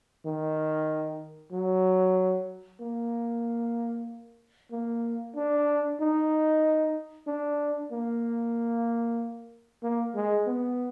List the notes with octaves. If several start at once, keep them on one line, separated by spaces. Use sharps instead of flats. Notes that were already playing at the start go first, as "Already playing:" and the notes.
D#3
F#3
A#3
A#3
D4
D#4
D4
A#3
A#3
G#3
B3